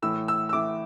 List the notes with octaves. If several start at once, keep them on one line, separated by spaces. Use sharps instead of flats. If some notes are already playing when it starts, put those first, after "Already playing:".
A2 E3 A3 E6
E6
E6
A2 E3 A3 D6